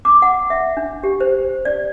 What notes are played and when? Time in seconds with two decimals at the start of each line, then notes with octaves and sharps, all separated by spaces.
0.05 D6
0.22 F#5
0.50 E5
0.77 D4
1.03 G4
1.20 C5
1.65 D5